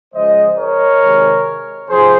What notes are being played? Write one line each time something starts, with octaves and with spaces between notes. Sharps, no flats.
C#3 F3 G#3 C5 D#5
A#4 C#5
C3 D#3 G#3
C3 F3 G#4 C5